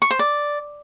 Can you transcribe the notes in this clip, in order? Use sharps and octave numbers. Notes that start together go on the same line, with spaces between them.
C#6
C5
D5